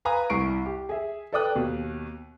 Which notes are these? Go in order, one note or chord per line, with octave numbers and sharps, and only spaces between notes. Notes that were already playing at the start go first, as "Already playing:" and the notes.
B4 F5 G#5 A#5 B5 D#6
C2 E4 C#6 C7 D7
G4
G#4 E5
A4 B4 D5 G5 D#6 F#6
D#2 B2